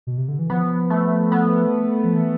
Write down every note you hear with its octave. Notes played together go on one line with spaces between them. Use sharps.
B2
C3
D3
E3
F3 B3
A3
B3
F3
E3